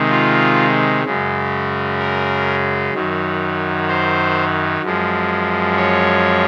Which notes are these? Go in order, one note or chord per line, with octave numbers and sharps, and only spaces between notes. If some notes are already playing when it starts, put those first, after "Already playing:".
Already playing: C3 D#3 G#3
F4
F#2 C#3 G#3
A#4
F#2 D#3 F#3
C5
F#2 F3 G#3
C#5